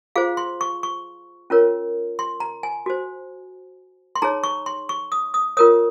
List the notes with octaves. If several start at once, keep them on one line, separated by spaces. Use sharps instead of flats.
F4 G#4 C5 F5
C6
C#6
C#6
C#4 F4 A#4 C#5
C6
A#5
G#5
F#4 C5
C6
D#4 G#4 C#5 A#5
C#6
C6
C#6
D#6
D#6
F4 A#4 C#5 D#6